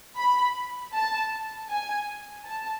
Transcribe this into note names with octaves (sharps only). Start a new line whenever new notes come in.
B5
A5
G#5
A5